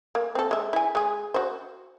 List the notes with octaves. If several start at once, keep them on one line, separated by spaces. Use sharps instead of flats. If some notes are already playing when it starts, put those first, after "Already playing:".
A#3
C4 A4
G#3 E5
E4 G#5
G#3 G#4
F#4 C5